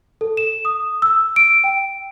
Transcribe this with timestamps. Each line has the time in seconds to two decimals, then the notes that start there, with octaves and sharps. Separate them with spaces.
0.21 A4
0.37 E7
0.65 D#6
1.02 E6
1.36 D7
1.64 G5